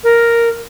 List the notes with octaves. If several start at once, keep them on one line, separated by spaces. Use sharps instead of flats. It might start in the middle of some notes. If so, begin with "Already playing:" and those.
A#4